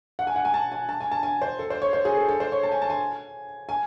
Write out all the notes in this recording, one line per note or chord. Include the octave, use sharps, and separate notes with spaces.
F#5
G#5
F#5
G#5
A5
G#5
A5
G#5
A5
G#5
C5
A4
C5
C#5
C5
G#4
A4
A4
C5
C#5
A5
G#5
A5
G#5
G#5